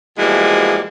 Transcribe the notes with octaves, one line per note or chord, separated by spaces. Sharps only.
B2 E3 F3 G3 G#3 A#3